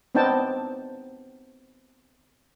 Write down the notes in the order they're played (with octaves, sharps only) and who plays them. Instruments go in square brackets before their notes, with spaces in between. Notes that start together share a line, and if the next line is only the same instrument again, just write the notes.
[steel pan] B3 C4 D4 D#4 G5 A5